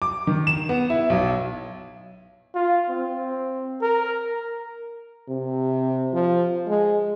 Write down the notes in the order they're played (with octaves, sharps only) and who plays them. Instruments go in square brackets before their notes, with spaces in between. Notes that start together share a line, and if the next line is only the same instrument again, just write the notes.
[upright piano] D6
D#3
E7
B3
E4
B1
[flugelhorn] F4
C4
A#4
[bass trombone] C3
F3
G#3